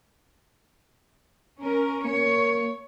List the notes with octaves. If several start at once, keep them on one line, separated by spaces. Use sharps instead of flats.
C#4 A#4
A#3 C#5